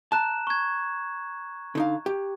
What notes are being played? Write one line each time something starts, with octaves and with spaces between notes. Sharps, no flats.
A5 A#5 F#6 E7
C#6 G#6
D3 D#4 F5
G4